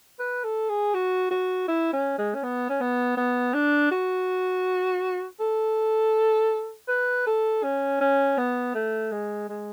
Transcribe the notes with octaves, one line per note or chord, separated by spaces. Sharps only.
B4
A4
G#4
F#4
F#4
E4
C#4
G#3
C#4
B3
C#4
B3
B3
D4
F#4
A4
B4
A4
C#4
C#4
B3
A3
G#3
G#3